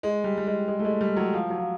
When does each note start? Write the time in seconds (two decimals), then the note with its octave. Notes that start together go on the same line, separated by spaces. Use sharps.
0.03 G#3
0.24 G3
0.38 G3
0.47 G#3
0.68 G#3
0.79 A3
0.85 G#3
1.01 G3
1.16 F#3
1.33 F3
1.50 F#3
1.58 F3